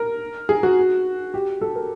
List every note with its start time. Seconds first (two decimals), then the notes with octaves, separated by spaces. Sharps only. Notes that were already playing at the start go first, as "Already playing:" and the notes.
Already playing: A#4
0.49 G#4
0.63 F#4
1.34 G4
1.61 A4
1.75 A#4